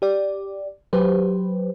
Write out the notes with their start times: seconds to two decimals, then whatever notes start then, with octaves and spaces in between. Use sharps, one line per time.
0.02 G4 D5
0.93 F#3 G4 B4 C5